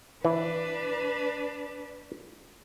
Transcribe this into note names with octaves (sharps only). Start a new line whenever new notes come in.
E3 D4 B4